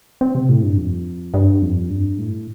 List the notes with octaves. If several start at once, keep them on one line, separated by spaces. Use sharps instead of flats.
C4
C3
A2
G2
F2
G2
F2
G2
A2